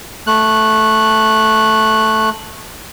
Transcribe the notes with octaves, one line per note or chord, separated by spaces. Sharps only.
A3 F#6